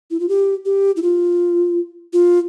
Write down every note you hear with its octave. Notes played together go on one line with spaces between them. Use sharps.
E4
F4
G4
G4
E4
F4
F4